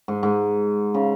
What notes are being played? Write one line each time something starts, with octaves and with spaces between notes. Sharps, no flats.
G#2
G#2
C#3